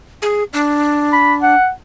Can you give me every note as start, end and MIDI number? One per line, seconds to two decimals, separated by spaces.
0.22 0.43 68
0.53 1.55 62
1.13 1.34 83
1.42 1.70 78